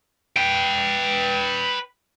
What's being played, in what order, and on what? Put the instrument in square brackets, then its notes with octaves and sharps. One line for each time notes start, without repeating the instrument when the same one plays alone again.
[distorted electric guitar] B4 G5